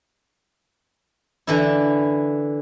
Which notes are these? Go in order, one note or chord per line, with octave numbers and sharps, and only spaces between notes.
D3 E3 E4